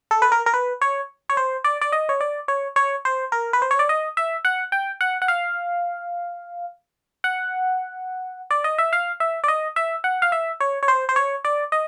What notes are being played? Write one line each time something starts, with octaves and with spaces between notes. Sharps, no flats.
A4
B4
A#4
A#4
B4
C#5
C#5
C5
D5
D5
D#5
C#5
D5
C#5
C#5
C5
A#4
B4
C5
C#5
D5
D#5
E5
F#5
G5
F#5
F#5
F5
F#5
D5
D#5
E5
F5
E5
D5
D#5
E5
F#5
F5
E5
C#5
C#5
C5
C5
C#5
D5
D#5